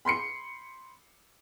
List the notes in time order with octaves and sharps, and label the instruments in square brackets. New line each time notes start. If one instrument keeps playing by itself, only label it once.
[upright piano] B5 C6 C7 C#7